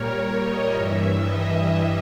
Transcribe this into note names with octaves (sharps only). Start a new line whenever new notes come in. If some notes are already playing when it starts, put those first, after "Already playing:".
Already playing: A#2 G3 A#4 C#5
C#5
D#5
G2 E3 G3 E5
D#5
D#5